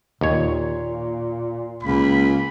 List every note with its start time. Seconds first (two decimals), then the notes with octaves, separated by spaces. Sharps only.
0.21 D#2 A#2 C#5
1.83 C#2 A#3 B5